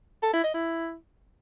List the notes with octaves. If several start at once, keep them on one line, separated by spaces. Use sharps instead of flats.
A4
E4
D#5
E4